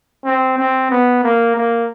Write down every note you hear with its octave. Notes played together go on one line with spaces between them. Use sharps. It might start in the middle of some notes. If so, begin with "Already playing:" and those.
C4
C4
B3
A#3
A#3